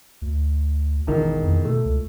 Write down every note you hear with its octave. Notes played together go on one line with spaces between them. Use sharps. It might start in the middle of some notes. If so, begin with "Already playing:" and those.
D2
E1 A1 D#3
F2
B2 A3
C#2